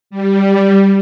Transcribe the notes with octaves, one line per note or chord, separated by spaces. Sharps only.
G3